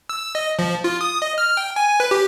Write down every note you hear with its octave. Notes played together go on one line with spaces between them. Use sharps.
E6
D#5
F3
F4
D#6
D#5
F6
G5
G#5
B4
G4